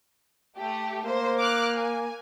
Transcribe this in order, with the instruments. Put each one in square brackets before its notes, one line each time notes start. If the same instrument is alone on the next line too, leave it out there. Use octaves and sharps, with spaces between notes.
[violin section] A3 G4
[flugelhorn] A#3 [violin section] C5
[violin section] D6 F6 F#6
G#5